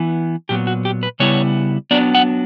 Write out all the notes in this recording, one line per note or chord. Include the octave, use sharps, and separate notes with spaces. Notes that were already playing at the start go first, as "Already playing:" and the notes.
Already playing: E3 B3 E4
A#2 F#3 B3 G4
F#4
G4
B4
C#3 G3 B3 E4 C#5
F#3 B3 D4 D5
F#5